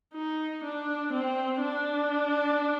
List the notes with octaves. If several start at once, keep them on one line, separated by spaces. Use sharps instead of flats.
D#4
D4
C4
D4